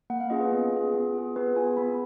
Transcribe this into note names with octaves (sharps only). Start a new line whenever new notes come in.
A#3 F#5
F5
C#4 F4 G#4 D#5
B4
B3
F4 G#4
B3
F4 G#4
B3 B4
F4 G#4 G#5
B3 B5